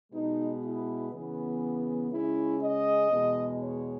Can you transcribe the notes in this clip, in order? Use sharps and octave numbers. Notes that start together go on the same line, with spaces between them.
B2 G#3 B3 D#4
E4
C#3 E3 B3
C#3 G#3 C#4 E4
D#5
E2 B2 G#3 B3
C#5